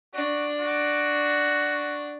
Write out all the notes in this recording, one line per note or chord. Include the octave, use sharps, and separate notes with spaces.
D4 F#4
F#4